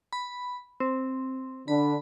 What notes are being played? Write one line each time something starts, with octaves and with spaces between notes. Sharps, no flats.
B5
C4
D3 D4 B5